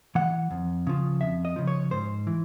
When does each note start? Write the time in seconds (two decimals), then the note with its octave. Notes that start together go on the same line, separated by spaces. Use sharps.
0.15 E3 F#5
0.51 F2
0.87 C#3 F3
1.21 F2 E5
1.45 D#5
1.56 C#3 F3
1.68 C#5
1.91 G#2 C5
2.27 E3